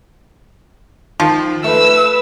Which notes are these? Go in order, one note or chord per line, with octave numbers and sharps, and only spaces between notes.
D#3 F3
A3 B4 E6